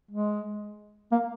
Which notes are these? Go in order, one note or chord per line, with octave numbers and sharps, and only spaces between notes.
G#3
A#3